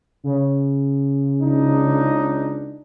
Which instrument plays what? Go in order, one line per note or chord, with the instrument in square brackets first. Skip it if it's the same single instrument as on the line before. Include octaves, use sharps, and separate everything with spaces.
[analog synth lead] C#3
[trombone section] C#2 D4 D#4